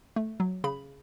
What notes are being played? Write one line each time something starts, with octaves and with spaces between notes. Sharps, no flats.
A3
F#3
C#3 B5